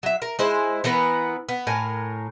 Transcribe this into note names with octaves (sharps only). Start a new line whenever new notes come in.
F#3 E5
A#4
G#3 E4 C5
E3 B3 A#4 B4
B3
A2 A#4 G#5